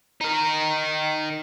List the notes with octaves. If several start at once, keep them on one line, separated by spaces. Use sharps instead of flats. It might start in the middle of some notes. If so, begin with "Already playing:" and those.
D#4 A#4